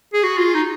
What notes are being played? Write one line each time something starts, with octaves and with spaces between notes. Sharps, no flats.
G#4
F#4
F4
D#4